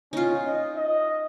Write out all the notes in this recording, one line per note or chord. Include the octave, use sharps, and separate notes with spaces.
C#4 D#4 F4
D#5
D#5